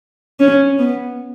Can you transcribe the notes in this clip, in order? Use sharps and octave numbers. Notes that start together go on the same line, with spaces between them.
C#4
B3